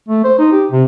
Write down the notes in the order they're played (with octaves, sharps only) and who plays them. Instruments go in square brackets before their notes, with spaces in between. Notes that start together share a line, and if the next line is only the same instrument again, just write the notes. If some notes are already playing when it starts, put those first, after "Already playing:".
[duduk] A3
C5
D#4
G4
C3